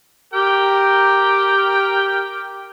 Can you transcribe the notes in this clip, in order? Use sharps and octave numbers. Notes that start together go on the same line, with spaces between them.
G4 A#4 G5